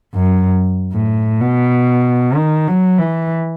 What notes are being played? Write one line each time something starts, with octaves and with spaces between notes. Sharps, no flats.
F#2
A2
B2
D#3
F#3
E3